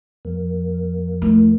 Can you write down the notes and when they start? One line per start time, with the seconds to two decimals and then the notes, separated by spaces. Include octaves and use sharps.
0.25 F2 A#3
1.22 A3 E4